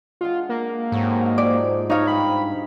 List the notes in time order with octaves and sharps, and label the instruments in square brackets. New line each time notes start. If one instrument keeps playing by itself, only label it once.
[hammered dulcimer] G#3 D4 F#5 [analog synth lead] F4
[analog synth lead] A#3
[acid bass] G#2 [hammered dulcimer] C3 F#3 A4
[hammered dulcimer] F3 [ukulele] D5
[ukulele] D#4 F5 [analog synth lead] C#5 [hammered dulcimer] A5
[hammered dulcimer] G2 G#4 G5 [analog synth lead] B5